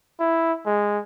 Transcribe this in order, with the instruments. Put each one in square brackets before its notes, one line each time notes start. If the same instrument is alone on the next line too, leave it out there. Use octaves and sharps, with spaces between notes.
[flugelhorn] E4
G#3